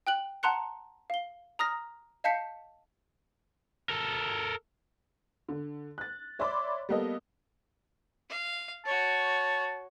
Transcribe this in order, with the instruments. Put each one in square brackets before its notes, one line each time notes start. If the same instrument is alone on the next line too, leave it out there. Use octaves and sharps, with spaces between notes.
[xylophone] G5 F#6 F#7
F#5 A5 A#5 C6 F#6 C#7
F5 G7
A#5 D#6 F6 A#6
D#5 F5 A5 G6 B6 C#7
[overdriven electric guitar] A4 A#4
[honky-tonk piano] D3
F#6 A6
C#5 D5 E5 B5 C6 D6
G3 A#3 B3 A4 D#5
[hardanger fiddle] F5
[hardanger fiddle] F#4 C#5 [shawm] A5